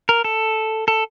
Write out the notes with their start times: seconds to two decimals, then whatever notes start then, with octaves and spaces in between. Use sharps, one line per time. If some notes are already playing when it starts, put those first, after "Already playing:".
0.09 A#4
0.24 A4
0.88 A4